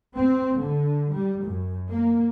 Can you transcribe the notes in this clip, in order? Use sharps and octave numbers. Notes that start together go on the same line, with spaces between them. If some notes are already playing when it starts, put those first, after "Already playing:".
C4
D3
G3
F#2
A#3